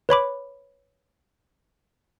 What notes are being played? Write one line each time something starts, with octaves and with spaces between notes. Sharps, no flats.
B4 C#5 B5 D6